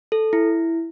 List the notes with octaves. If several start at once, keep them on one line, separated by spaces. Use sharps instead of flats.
A4
E4